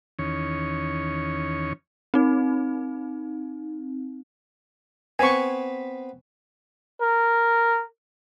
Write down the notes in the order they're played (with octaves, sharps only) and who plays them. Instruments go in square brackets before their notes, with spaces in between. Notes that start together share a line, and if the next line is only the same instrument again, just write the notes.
[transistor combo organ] E2 D#3 C#4 C#5
[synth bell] C4 D#4
[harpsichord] B3 C4 B4 [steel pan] G#5 C#6
[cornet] A#4